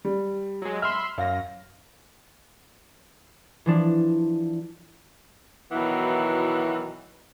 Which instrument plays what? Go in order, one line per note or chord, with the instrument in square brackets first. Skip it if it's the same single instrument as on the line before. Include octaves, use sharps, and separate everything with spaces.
[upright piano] G3
[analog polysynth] F#3 G#3
[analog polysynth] E5 B5 C6 [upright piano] F6
[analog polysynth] F#2 A#6 [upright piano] F5
[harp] E3 F3 D4
[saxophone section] B2 D#3 E3 F#3 B3 E4